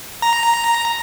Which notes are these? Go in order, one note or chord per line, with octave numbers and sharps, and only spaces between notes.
A#5